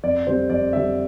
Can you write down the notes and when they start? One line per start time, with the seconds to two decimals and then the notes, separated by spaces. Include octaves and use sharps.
0.03 F2 D5
0.27 D3 G3 C4 C5
0.50 F2 D5
0.73 D3 G3 C4 E5